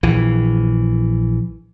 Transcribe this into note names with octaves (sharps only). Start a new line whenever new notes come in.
A#1 E3